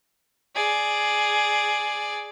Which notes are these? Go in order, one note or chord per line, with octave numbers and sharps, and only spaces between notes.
G#4 D5